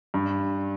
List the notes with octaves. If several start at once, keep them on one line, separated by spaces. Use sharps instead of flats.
G2